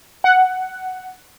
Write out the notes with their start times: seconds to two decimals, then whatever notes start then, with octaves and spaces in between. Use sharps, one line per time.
0.24 F#5